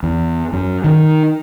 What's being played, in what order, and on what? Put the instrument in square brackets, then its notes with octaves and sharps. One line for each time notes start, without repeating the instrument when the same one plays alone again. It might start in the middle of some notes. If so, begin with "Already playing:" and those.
[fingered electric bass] E2
F#2
D#3